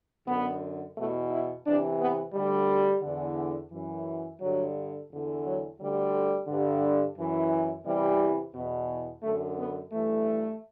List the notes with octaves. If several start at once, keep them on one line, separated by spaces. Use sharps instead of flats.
F#2 D3 B3
E2 B2 A3
E4
E2 C3 E3 D4
B3
D2 D3 G3
E2 D3
F#2 E3
G2 D3 F#3
E2 D3
F#3
D2 D3 G3
G2 D3
F#2 E3
E2 C3 E3 G3
E2 B2
F#2 D3 A3
B3
G2 E3 A3